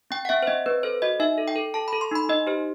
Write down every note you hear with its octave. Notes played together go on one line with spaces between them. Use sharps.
C4 G5
F#5
C4 E5
C5
C4 D#5
C4 B4
A4 C5
F#4 D#5
D#4 E5
A4
G5
A4
A4 A5
B5
A4
C6
D#4 B5
D#4 D#5
G4 C5